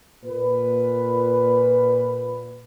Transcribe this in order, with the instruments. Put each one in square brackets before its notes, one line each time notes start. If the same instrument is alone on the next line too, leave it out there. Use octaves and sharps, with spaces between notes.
[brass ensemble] A#2 B4